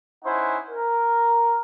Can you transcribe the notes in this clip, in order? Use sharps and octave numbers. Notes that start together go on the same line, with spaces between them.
C#4 D#4 E4 C5 F#5 G#5
A#4